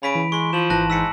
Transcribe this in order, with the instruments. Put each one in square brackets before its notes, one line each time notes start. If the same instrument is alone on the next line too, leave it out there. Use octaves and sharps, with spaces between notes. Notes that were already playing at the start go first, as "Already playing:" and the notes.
[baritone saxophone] C#3 [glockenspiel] B5 B6 D7
[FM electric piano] E3
[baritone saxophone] G#3 [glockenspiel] C6 C#6
[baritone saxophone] F3 [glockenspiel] E7 F#7
[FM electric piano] G#1 E3 [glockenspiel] A5 F#6 A#6
[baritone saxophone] G#2 [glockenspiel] E6 B6 C#7